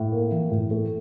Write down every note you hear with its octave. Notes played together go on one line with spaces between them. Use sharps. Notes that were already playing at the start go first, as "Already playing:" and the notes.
Already playing: A2
A#3
E3
A2
A3